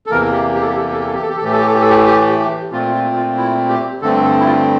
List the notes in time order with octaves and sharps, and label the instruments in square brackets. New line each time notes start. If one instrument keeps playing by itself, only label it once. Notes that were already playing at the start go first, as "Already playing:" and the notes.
[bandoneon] A4
E2 C3 E3 A#3 A#4
G4
G4
A4
G4
A4
G4
A4
G4
A4
G4
A4
G4
A4
A2 E3 A3 G4
A4
G4
A4
G4
A4
G4
G4
G4
A#2 A3 C4 F4
F4
F4
E4
G4
G2 D3 A3 C4 A4
A4
E4
F4